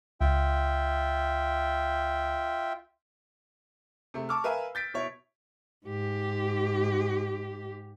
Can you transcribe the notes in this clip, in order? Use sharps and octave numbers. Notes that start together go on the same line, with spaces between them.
C#2 F4 E5 G5
C3 A3
A5 C#6 D6 E6 F6
A#4 B4 E5 F5 G#5
G6 A6 B6 D7
B2 E4 C#5
G#2 G4